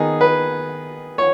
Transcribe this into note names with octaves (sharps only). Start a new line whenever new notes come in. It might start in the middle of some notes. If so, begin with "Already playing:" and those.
Already playing: D#3 B3 D#4 G#4
B4
C#5